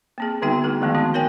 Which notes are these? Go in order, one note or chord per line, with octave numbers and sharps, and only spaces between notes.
A#3 C4 G#4
D3 G3 B3 D#4 F#4 G5
D3 A3 E4 G#4
D#3 F3 G#3 A3 B3 C4
C4 D#4 F#4
A#4 C#5 G5 G#5